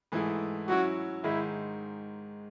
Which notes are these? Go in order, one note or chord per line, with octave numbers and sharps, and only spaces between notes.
G#2 E3 A3 E4 G#4
F#3 C#4 E4 F#4
G#2 D#3 G#3 E4